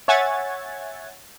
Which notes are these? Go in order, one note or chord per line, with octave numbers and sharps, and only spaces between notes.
C#5 E5 F#5 G#5 G#6 A6